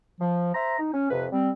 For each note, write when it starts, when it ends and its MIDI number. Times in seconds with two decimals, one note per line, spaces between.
0.21 0.52 53
0.55 0.79 72
0.55 0.79 76
0.55 0.79 82
0.79 0.90 63
0.93 1.10 61
1.10 1.26 41
1.10 1.26 48
1.10 1.26 71
1.32 1.51 55
1.32 1.51 60